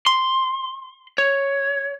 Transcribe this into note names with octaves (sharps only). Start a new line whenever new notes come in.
C6
C#5